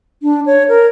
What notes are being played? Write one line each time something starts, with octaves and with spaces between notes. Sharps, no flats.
D4
C#5
A#4